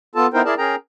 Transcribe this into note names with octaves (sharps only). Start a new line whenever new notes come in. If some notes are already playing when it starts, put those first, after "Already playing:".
B3 F4 A4 A5
B3 D#4 E4 A#4 C5 G5
E4 G#4 A#4 D5 A5
C#4 G#4 A#4 G5 A#5